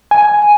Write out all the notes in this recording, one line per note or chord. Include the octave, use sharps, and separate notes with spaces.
G#5